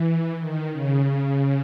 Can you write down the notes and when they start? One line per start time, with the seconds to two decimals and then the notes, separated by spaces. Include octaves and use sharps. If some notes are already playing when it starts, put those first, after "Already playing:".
Already playing: E3
0.39 D#3
0.72 C#3